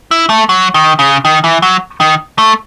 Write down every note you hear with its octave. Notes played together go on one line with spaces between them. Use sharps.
E4
A3
F#3
D#3
C#3
D#3
E3
F#3
D#3
A3